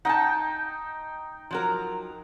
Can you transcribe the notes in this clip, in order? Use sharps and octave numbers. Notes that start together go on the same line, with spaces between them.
D#4 F#5 G5 A5
F3 F#3 A#4